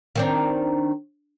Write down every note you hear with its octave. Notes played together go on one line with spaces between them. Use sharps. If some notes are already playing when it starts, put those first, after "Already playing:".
D#3 C4 D4